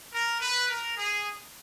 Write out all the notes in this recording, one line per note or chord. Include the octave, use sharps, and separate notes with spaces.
A#4
B4
A#4
G#4